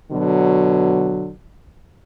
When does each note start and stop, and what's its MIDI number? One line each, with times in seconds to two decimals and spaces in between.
0.12 1.31 47
0.12 1.31 50
0.12 1.31 54